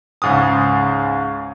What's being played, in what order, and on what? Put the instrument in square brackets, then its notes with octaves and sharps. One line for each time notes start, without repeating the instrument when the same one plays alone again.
[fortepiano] C#2 G#2 D#6